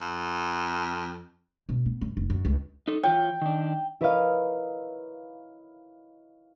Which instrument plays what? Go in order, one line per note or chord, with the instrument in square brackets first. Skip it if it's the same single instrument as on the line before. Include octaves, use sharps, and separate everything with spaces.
[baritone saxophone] F2
[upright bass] B2
B3
F#2
F1
F#2
C#2
[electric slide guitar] D#4 A4
[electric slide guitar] E3 F4 C#5 [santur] G5
[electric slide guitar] D#3 D4
[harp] E4 A#4 B4 C#5 D#5 F5